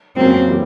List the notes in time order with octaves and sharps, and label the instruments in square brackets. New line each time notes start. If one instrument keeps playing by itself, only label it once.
[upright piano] F2 C#3 F#3 A#3 C#4 [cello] C4
[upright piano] E3 G3 A#3